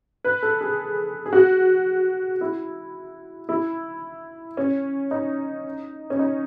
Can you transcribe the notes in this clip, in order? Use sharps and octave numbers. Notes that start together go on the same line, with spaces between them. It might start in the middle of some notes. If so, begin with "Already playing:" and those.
B4
A4
G#4
G#4
F#4
E4
E4
C#4
D#4
C#4
D#4